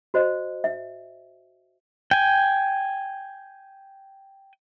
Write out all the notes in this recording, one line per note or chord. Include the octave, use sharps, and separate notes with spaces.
F#4 C5 D#5
E5
G5 G#5